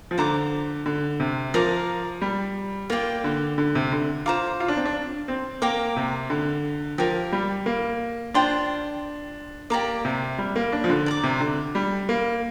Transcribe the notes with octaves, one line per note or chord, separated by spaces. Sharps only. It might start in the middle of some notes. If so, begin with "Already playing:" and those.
F3
D3 C5 A#5 D6
D3
C3
F3 A#4 F5 A#5 D6
G3
A#3 F4 D5 G5
D3
D3
C3
D3
F4 C5 A#5 D6
F4
D4
C4
D4
C4
A#3 A#4 G5 A#5 D6
C3
D3
F3 G4 A#4 F5
G3
A#3
D4 F4 C5 G5 C6
A#3 G4 D5 A#5 D6
C3
G3
A#3
D4
F3
D3
D5 A#5 D6
C3
D3
G3
A#3